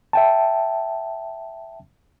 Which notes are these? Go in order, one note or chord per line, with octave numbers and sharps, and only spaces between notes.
E5 G5 A5